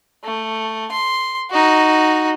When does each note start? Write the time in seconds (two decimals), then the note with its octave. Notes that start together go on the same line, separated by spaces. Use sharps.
0.24 A3
0.91 C6
1.51 D#4 F#4